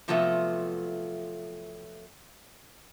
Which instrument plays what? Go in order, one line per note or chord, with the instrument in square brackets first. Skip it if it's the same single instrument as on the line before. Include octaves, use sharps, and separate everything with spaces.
[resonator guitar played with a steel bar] C3 F3 F#3 A3 B3 A4